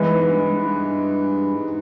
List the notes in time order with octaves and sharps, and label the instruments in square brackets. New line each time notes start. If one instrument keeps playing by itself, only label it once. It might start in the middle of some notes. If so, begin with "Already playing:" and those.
Already playing: [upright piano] E3 G#3 B3
[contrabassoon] G#2
G2
G2
G#2
G2
G#2